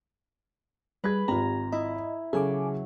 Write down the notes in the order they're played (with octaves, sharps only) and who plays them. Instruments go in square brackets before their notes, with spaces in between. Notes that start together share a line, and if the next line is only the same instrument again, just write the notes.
[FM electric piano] G3 [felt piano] G#4 G#6 [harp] B4
[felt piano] G#1 F4 [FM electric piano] G4 [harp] A#5
[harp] E4 [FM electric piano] D#5
[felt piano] C#3 [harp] F#3 [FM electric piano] A4 G#5 D6